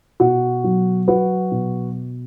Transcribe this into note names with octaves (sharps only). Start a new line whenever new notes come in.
B2 F#4
F#3
F#3 F#4 B4
B2